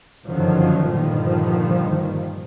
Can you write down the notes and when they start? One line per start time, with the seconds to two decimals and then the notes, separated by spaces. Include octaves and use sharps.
0.25 G1 F#2 D3 D#3 F3 F#3
0.90 G2 A#2 D3 D#3 F3